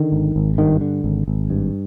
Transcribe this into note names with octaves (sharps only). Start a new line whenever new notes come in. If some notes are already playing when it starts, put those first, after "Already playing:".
Already playing: D3 D#3
G#1
G#1
G2 D#3
D3
G#1
G#1
G2